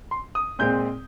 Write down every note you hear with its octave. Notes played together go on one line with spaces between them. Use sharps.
C6
D#6
A#2 G#3 C4 G6